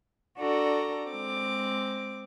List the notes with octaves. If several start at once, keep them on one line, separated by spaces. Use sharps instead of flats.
D4 F#4 A4 D5 A#5
G#3 C4 D6